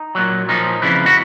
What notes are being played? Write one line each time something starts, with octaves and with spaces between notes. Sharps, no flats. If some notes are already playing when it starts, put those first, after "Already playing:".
Already playing: D#4
A#2 F#3
A#2 F3 D#4
F2 C#3 E3 E4
F#4